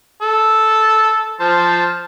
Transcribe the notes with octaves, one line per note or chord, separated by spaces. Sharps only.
A4
F3 C5 A5